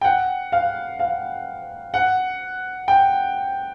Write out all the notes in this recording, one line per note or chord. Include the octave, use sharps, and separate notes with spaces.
G5
F#5
F5
F5
F#5
G5